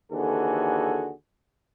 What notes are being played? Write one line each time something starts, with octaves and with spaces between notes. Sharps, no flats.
D#2 D3 E3 F#4 G#4 A4